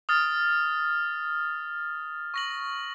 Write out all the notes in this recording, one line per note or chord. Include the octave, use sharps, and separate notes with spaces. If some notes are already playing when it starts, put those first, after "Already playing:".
D#6 F6 A6
C#6 A#6 F#7